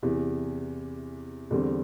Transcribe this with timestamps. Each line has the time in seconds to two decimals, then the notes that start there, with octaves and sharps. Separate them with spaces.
0.03 E2 C3 E3
1.50 E2 D3 G3 C4